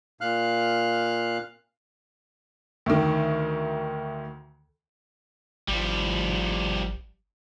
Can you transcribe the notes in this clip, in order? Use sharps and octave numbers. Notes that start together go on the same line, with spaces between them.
A#2 F5 F6 F#6
D2 D#3
G#1 F3 G3